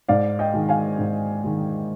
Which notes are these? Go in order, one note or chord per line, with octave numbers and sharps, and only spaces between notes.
G#2 D5 F5
D#5 G5
D#3 G#3
F5 G#5
G#2
D#3 G#3